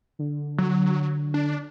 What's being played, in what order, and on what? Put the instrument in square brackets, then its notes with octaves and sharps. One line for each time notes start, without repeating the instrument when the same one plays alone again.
[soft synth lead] D3
[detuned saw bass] F#3
D4